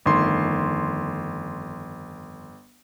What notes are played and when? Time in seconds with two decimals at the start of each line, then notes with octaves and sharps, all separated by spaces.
0.06 G1 F2 D#3 A3 C6